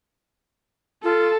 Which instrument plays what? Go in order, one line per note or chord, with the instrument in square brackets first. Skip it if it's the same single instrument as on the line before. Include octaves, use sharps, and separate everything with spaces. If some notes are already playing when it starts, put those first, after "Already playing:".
[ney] F4 [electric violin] A4